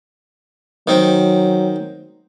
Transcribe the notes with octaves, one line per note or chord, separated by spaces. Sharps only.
D#3 F#3 C4